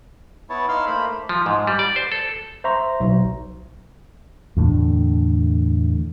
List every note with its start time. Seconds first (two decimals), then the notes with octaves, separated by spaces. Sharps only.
0.50 B3 E4 C#5 A5
0.69 D#4 E4 F5 C6 E6 F6
0.86 A3 A#3 C5 B5
1.29 F3
1.46 G#2
1.67 G3
1.79 D5
1.96 C5
2.12 A4
2.64 C5 E5 A#5 C6 C#6
3.00 B1
4.57 E2 A2 D3